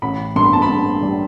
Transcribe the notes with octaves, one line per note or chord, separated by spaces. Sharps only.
A1 B5
G2 C6
B5
A5
B5
G2
G3